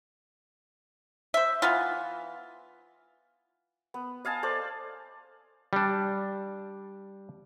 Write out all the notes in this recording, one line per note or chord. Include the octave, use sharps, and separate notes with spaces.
C5 E5
E3 B3 F4
B3
D#5 F5 G#5 A5
A4 C5 D5
G3 D4